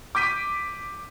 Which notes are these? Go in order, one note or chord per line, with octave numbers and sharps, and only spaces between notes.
D6 G6 B6 D#7